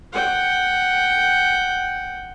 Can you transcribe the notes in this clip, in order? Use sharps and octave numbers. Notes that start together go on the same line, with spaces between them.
F#5 G5